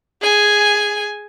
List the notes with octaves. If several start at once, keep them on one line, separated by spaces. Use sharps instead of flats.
G#4 G#5